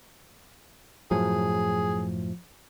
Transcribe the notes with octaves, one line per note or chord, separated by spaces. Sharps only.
F#2 A2 F3 F#3 G#4